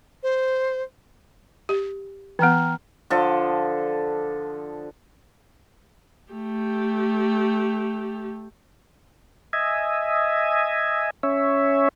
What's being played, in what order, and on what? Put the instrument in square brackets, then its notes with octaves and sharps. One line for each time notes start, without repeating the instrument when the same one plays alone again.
[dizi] C5
[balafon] G4
[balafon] E3 B3 [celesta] G5 A#5 F6
[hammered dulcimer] D3 F3 A4
[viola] A3 G4
[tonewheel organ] D#5 E5 G#5
C#4 C#5 E5